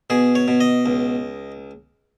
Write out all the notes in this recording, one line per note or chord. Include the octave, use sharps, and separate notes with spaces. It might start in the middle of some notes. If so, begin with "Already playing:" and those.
B2 G#4
C#5
B2
D#5
C#2